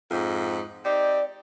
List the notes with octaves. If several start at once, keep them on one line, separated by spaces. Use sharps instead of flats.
F2 G#2
C4 D#4 G4 D5